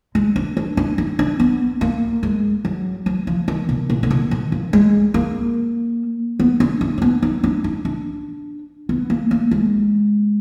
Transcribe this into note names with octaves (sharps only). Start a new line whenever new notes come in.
G#3
D4
D4
D4
D#4
D4
B3
A#3
G#3
F#3
F#3
F3
D#3
B2
A#2
D3
B2
D#3
F3
G#3
A#3
B3
D4
D4
D4
B3
D#4
D4
D#4
D4
B3
A#3
A#3
G#3